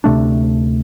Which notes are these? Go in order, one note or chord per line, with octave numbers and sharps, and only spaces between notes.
D2 C3 A3 D4